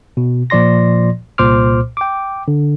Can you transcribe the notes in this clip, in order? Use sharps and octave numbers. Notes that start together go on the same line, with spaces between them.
B2
A#2 F3 D5 C6 A#6
C2 A#2 C5 C6 D6 F6
G5 D6
D3